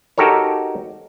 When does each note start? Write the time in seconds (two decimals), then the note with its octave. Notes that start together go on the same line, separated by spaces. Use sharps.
0.18 D#4 F#4 G4 A4 A#4 C#5